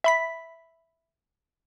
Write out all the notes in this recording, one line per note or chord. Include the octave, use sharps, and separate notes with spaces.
E5 B5 B6